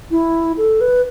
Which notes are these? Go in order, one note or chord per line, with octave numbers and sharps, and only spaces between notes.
E4
A4
B4